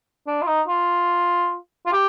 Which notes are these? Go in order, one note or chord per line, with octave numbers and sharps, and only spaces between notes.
D4
F4
D#4
F4
F4
G4